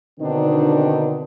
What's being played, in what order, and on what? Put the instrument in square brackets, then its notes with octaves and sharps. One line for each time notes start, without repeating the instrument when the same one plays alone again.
[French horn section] B2 D3 D#3 C4 D4 D#4